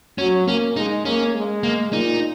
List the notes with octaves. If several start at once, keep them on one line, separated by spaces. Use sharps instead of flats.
F#3 C#4
A#3 C#4
G#3 D#4
A#3 C#4
G#3
A#3
A#2 D#4